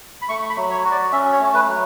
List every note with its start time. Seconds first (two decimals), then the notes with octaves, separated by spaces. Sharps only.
0.22 B5
0.29 A3 C#6
0.49 B5
0.56 F#3
0.71 C#5
0.84 F#4
0.91 D5
1.12 C#4 E5
1.33 C#5
1.40 A3
1.54 B4
1.68 F#3